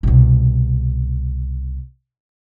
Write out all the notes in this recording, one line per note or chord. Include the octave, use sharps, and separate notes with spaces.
C2 B2